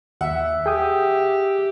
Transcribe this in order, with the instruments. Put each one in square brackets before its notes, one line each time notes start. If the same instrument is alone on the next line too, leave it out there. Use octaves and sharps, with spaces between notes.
[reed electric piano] D#2 [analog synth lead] E5 [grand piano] F#5
[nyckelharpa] G4 [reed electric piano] G#4 G5 D#6